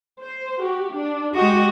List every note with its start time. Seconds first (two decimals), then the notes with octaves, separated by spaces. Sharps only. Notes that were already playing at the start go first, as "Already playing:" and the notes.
0.20 C5
0.59 F#4 G4
0.93 D4
1.36 G#3 F#4 G4 D#5